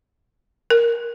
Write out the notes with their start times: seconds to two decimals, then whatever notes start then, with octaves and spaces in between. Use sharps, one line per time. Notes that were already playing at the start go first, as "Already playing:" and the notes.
0.70 A#4